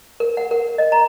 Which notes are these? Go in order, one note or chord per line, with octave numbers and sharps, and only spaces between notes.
A#4
F#5
A#4
D#5
A#5